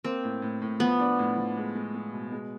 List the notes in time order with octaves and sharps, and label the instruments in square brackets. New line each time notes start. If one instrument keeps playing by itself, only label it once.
[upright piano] A#3 [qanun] C4
[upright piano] A2
A2
A2
[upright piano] F3 [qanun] B3
[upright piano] D4
A2
F3
G#3
G#3
G#3
B2
G#3